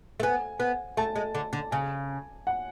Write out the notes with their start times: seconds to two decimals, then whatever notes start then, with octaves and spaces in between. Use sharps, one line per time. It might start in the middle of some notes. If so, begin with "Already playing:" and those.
0.20 A3
0.23 B3 G#5
0.60 B3
0.97 A3 A5
1.15 G#3
1.34 D3
1.53 D3
1.71 C#3 G#5
2.47 F#5